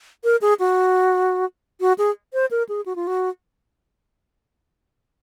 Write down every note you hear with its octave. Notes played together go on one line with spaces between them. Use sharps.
A#4
G#4
F#4
F#4
G#4
C5
A#4
G#4
F#4
F4
F#4